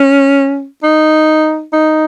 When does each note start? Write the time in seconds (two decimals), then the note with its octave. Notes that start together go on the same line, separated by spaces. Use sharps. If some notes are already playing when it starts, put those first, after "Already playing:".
Already playing: C#4
0.84 D#4
1.73 D#4